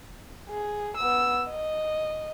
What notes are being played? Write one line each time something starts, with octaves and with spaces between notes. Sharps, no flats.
G#4
B3 E6
D#5